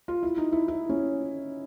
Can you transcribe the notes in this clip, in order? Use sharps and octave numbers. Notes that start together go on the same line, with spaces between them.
F4
E4
D#4
E4
E4
C#4